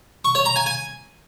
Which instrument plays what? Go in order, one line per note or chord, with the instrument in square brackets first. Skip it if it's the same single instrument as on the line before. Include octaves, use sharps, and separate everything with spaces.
[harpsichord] C#6
C#5
A#5
G#5
G#5